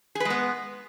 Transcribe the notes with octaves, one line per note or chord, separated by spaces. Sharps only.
G#3 B3 G#4 B4